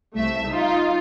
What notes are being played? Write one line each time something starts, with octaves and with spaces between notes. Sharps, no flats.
C2 A3 E5
D#4 F4